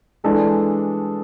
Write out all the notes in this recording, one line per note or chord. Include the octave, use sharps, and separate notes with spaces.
E3 G#3 D4 A4